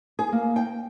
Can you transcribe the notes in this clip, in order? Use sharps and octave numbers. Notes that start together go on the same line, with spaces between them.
G#4
A#3
G5